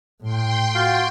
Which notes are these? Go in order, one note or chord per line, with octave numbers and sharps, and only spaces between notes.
A2 G5 C6
F4 F#4 F5